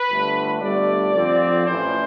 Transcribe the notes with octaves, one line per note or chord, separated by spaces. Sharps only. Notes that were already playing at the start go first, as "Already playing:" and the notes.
Already playing: B4
G1 G2 D3 A3
G1 G2 D3 A3 D5
F2 D3 F3 C4
A1 A2 E3 C5